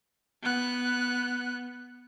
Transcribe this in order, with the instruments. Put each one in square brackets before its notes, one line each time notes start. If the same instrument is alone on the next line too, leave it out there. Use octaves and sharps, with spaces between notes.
[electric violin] B3 F#6